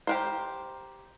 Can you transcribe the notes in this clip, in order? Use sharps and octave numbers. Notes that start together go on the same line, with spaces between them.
G4 A#4 C5